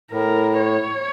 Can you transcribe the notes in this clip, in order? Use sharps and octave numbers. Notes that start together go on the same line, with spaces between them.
A2 A#4
C#5